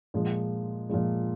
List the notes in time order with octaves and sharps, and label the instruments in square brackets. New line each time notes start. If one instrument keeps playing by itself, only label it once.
[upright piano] A#2 F3 G#3
A#2 F3 G#3